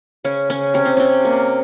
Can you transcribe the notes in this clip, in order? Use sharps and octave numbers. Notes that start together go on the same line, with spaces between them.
C#3 C#4
C#3 C#4
C3 C#4
C4
C3 C#4
A#3